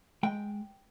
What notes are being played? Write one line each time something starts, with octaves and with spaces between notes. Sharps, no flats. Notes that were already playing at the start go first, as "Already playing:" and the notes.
G#3 G5